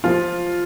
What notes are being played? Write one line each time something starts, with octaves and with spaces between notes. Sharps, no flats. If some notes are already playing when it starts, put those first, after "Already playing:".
F3 F4